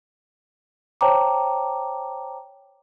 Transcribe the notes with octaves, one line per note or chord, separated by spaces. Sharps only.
C5 C#5 G5 A5 A#5 D6